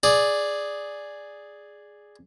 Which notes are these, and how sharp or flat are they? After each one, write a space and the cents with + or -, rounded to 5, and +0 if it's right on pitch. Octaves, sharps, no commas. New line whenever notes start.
G#4 +0 D5 +0